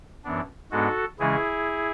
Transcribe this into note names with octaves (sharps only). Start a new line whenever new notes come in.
F#2 E3 B3 D4
G#2 G#3 B3 D4 F#4 A4
C#3 E3 G#3 C#4 E4 G#4